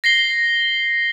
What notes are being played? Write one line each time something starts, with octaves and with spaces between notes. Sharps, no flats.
A#6 C7 G7